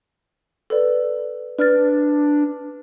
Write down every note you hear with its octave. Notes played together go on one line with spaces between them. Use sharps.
A4 B4 D5
D4 B4 F6 A6